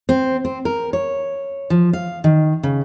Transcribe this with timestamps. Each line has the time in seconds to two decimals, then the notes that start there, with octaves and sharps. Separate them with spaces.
0.09 C4
0.45 C4
0.65 A#4
0.93 C#5
1.70 F3
1.93 F5
2.24 D#3
2.63 C#3